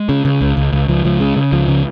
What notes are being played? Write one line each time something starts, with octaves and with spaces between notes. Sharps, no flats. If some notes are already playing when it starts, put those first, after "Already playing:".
Already playing: G#3
C#3
C#3
C#2
C#2
C#2
C#2 F3
C#2 F3
C#3 G#3
C#3
C#2 F3
C#3